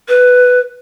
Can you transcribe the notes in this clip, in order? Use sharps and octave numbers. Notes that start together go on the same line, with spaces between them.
B4